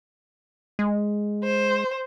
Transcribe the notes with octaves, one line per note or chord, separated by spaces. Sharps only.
G#3
C5